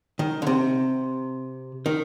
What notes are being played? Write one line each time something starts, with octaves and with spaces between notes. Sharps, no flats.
D#3
D3
C3
D#3